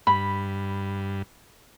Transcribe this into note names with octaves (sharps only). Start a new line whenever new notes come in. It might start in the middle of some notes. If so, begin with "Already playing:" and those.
G2 B5